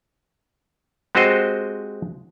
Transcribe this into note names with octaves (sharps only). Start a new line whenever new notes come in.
G#3 C4 F#4 G4 C5 D#5